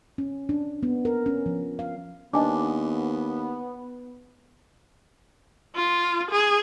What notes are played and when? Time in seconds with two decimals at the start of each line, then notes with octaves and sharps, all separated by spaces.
0.18 C#4
0.49 D4
0.83 B3
1.05 A#4
1.26 C#4
1.46 F3
1.79 F5
2.33 D#2 B3 D4 D#5 G#5 D6
5.76 F4
6.31 G#4